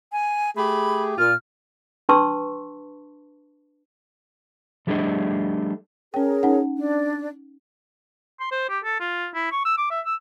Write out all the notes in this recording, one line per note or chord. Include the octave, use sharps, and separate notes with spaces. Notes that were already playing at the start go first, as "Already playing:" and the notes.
G#5
A3 G4 G#4 B5
A#2 F4 F6
D4 B4 A5 C6 C#6 E6
F3 G3 A3 D4 G#4 D#5
C#4 G#4 A#4 C#5 G5
C#4 D#4 F#5
D4
C6
C5
G4
A4
F4
E4
C#6
E6
D6
E5
E6